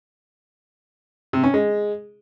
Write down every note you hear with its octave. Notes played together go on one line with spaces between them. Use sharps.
C3
C#4
G#3